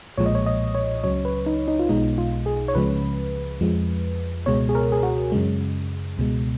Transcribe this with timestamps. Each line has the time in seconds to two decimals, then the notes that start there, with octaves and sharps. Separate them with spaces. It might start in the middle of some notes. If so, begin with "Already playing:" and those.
0.18 B1 A#2 F3 G#3 C#5
0.26 D#5
0.35 C#5
0.46 D#5
0.75 C#5
1.03 C#2 C#3 F#3 C#5
1.25 B4
1.46 D#4
1.68 D#4
1.79 F4
1.89 B1 B2 G#3 D#4
2.18 F4
2.46 G#4
2.68 C#5
2.75 C#2 C#3 F3 G#3 B4
3.61 F2 F3 G#3
4.46 C#2 B2 G#3 C#5
4.69 G#4
4.75 A#4
4.92 G#4
5.03 F#4
5.32 F#2 C#3 G#3
6.17 C#2 B2 G#3